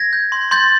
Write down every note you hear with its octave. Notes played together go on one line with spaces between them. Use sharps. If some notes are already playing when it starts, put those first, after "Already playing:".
Already playing: G#6 A#6
G6
C6
C6 G6 A6